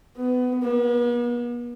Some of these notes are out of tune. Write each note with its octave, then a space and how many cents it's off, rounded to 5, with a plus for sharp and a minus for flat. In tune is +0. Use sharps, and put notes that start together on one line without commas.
B3 +20
B3 -45